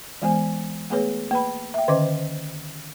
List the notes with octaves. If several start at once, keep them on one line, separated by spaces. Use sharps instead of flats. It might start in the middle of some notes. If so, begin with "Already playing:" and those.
E3 G#3 B3 C5 G#5
A3 B3 G#4 B4 C#5
A#3 B4 B5
E5 G5
D3 D#3 C#4 C5 D#5 D6